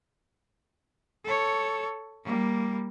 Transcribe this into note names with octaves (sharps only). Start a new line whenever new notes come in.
A4 C#5
G3 A#3